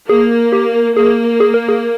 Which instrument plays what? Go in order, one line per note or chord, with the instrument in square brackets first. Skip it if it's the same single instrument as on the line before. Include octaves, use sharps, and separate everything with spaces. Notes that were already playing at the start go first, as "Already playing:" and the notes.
[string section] A#3 [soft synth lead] G#4
[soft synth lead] G4
[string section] A#3 [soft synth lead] G#4
[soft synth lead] G#4
A#4
G#4